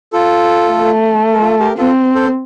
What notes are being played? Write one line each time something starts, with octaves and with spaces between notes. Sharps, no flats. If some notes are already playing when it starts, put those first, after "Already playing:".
F4 A4
A3
A#4
F4 A4
G4 A#4
C4 F4 A4
A4 C5